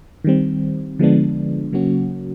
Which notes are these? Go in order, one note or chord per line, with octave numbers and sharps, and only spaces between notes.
D#3 G3 C4
D3 F3 G#3 B3 D4
C#3 F#3 A#3 C#4 F#4